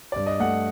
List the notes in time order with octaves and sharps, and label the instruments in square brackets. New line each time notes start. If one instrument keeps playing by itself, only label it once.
[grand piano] G2 D5
D#5
A3 F#5